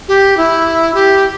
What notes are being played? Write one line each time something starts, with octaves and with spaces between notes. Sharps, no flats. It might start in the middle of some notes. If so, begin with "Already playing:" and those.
G4
E4
G4